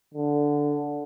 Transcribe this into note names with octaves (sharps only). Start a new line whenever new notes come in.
D3